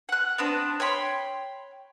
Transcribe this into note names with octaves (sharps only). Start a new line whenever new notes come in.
F#5 F#6
B3 C4 D4
C#5 G5 B5 C6